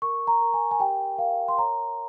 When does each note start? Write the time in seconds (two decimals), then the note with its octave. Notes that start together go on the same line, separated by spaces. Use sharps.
0.02 A#4 C#6
0.27 A#5
0.41 A#4
0.54 G#5
0.71 G#5
0.80 G4 G5
1.18 A#4 F5
1.48 C6
1.58 C#5 A#5